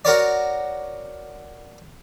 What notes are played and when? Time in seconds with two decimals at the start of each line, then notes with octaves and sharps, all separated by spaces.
0.05 F#4 A#4 C#5 D5